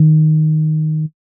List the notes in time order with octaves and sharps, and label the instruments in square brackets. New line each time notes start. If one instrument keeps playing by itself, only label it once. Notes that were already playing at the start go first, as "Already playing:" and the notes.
Already playing: [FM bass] D#3